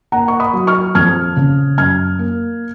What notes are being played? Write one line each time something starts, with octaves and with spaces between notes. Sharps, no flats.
A#3 F#5 A#5
C#6
B5 D#6
F#3
C#6 F6
F2 F6 G#6
C#3
F#2 F6 G#6
A#3